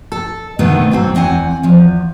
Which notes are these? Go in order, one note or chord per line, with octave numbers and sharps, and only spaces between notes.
A4
B2 D3 D#3 A3 B3 C4
G#2 F#3 C4 A4
E2 C4 F#5 G#5
E2 F3